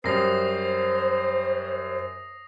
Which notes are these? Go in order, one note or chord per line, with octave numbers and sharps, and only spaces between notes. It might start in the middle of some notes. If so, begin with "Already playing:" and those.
F#2 G3 C5 D#6 A#6 C7